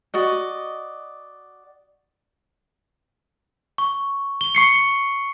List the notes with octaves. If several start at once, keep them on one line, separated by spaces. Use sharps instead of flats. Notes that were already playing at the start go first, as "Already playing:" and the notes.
F#4 D5 D#5
C#6
G7
C#6 C7 C#7